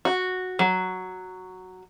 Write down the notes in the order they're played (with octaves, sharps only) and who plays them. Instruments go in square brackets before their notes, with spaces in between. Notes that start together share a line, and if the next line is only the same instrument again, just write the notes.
[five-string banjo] F#4
F#3